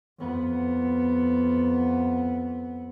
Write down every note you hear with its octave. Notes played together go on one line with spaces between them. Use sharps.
F2 B3